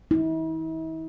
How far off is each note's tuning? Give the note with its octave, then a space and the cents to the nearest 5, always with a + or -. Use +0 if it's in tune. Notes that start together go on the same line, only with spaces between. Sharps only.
E4 -45